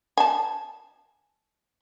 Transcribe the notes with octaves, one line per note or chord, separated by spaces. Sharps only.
G#5 A5